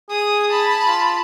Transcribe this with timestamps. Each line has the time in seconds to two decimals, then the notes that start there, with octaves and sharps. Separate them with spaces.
0.10 G#4 D#6
0.49 A5 B5
0.87 F4